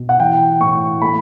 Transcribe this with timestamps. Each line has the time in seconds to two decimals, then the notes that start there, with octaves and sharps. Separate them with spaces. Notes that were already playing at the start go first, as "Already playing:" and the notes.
Already playing: B2
0.09 F#5
0.20 E3 G5
0.60 A2 C#6
1.02 A3 B5